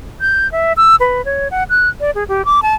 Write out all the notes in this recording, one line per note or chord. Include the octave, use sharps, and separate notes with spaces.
G6
E5
E6
B4
C#5
F#5
F#6
D5
G#4
G4
D6
A5